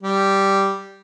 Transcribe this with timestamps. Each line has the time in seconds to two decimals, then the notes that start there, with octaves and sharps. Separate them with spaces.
0.03 G3